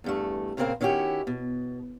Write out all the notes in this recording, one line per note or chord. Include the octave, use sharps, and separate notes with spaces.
E2 G2 A3
A#2 C#3 A#3 C4 A#4 F5
D#3 C#4 E4 F#4 G4
B2